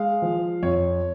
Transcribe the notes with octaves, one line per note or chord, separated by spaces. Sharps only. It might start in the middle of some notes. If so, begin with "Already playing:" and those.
Already playing: G#3 F5
F3
F2 C#5